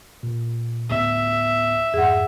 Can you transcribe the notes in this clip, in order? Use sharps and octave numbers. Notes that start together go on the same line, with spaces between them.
A#2
D2 A2 B3 E5
F2 G#2 G#4 F#5